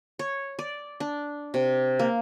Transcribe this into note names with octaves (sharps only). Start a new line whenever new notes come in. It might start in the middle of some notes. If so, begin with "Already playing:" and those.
C#5
D5
D4
C3
A#3